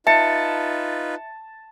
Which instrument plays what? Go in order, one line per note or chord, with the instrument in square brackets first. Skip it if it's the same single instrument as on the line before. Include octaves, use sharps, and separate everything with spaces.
[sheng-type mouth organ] D#4 F4 B4 [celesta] E5 C#7 [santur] A5